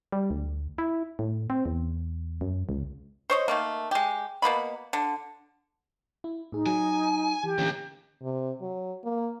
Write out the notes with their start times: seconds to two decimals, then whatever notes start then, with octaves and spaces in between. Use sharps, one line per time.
0.12 G3
0.30 D2
0.78 E4
1.19 A2
1.50 C4
1.65 E2
2.41 F#2
2.69 C#2
3.30 C5 C#5 D#5
3.48 D#3 A3 A#3
3.91 G#3 G4
4.42 B2 A#3 B3 B5
4.93 D3
6.24 E4
6.52 A2 D#4 G#4
6.66 F#3 G#5
7.44 E3 G4
7.58 D#2 A#2 D3 E3 C#4
8.22 C3
8.61 F#3
9.04 A#3